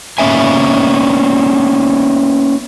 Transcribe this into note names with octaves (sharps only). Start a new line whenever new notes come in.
A#3 B3 C#4 E5 G#5